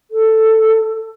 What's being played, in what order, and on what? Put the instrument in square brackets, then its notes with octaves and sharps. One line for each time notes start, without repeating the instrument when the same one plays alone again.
[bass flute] A4